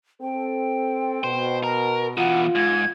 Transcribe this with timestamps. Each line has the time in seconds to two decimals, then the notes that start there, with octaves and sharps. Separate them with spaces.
0.22 C4 A4 G5
1.24 B2 C5
1.64 A#4 A#5
2.17 E2 B2 F4 F#5
2.55 G#2 G#6